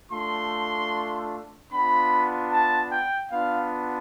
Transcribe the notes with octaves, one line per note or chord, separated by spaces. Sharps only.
A3 D4 F4 C6
B3 D4 F4 B5
A5
G5
B3 D4 F4 F5